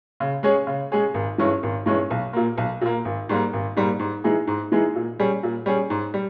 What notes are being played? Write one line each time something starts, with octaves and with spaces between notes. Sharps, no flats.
C#3
G#3 C#4 G#4 C#5
C#3
G#3 C#4 G#4 C#5
G#1
G2 E3 G#3 C#4
G#1
G2 E3 G#3 C#4
B1
A#2 A#3
B1
A#2 A#3
G#1
G#2 G3 A#3
G#1
G#2 G3 A#3
G#2
E3 G#3 D#4 G#4
G#2
E3 G#3 D#4 G#4
A#2
G3 C#4 G#4
A#2
G3 C#4 G#4
G#2
G3